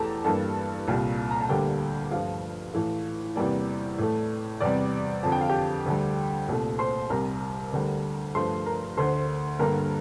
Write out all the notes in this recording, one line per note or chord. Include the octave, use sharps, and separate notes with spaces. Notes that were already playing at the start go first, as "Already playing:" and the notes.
Already playing: E2 E3 A3 G4 A4 G5 A5 A#5
G2 E3 G3 A#3 A4 A5
C2 A#2 G3
A#5
A5
D2 D3 G3 A#3 G4 G5
G2 F3 A3 F4 F5
A2 E3 A3
E2 C3 E3 G3 A#3 D5
A2 E3 A3
E2 C3 G3 D5
F2 D3 F3 A5
G5
F5
G4 G5
D2 D3 G3
C2 A#2 A3
C5 C6
C2 C3 G3 A#4 A#5
D2 D3 G3
G2 F3 A3 C5 C6
A#4 A#5
D2 D3 A3 C5 C6
G2 D3 G3 A#3 A#4 A#5